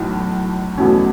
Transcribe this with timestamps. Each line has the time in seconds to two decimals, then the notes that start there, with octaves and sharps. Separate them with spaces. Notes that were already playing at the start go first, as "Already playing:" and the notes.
Already playing: B1 A2 E3
0.77 E2 B2 F#3 A3 C#4